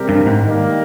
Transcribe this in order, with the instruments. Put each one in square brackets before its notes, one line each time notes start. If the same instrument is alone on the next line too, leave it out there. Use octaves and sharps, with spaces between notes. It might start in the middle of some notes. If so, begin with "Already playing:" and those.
Already playing: [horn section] C3 G3 C4 G4 A#4
[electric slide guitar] G2
G#2
[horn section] D#3 G3 A#3